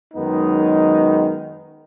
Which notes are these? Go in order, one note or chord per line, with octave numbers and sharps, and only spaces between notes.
F#2 D#3 G#3 B3 D#4